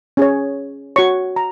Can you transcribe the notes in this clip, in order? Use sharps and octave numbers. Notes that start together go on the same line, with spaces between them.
C#4 G#4 C#5
F#4 C#5 C#6
A#5